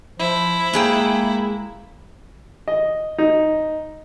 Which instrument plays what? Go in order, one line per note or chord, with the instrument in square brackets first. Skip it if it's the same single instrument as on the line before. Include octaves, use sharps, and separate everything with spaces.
[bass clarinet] F3 [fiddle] E4
[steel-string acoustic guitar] G#3 G#4 G5 [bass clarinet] A#3
[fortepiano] D#5
D#4